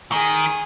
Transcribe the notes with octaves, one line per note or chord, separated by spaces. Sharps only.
D#3 G#4